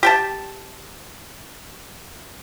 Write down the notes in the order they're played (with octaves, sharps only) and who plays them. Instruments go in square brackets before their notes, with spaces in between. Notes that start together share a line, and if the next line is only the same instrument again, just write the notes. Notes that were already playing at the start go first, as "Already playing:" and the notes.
[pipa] G4 G5 A5